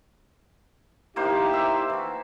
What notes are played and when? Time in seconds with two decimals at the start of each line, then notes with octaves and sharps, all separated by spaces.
1.16 A#3 D#4 E4 G4 A#4 C5
1.53 E5
1.90 E3 F#4